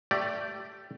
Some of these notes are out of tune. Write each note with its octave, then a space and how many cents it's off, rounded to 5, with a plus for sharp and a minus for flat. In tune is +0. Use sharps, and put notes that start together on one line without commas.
A3 +15 G4 -10 D5 +0